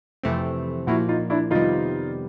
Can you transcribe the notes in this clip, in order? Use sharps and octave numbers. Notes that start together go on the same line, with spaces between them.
F2 C3 E3 A3 C4
A#2 F3 A#3 E4 F#4
D#4 F4
D4 E4
F2 C3 D#3 G3 B3 D#4 F4